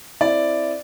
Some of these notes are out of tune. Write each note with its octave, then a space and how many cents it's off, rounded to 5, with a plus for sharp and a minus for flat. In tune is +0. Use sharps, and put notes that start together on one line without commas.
C4 +0 E4 +0 D5 +0